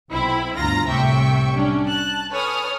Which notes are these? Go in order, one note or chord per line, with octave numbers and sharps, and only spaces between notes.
B1 C4 E4 B5
G1 D2 F4 A#5 A#6
C2 A2 C3 E5 G5 C#6
G3 C#4 D4
A5 F#6
A4 B4 C#5 G#5 D#6 F6